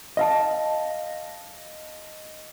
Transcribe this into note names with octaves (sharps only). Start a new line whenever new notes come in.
D#5 F5 A5